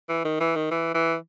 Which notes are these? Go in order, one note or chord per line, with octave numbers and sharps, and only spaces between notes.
E3
D#3
E3
D#3
E3
E3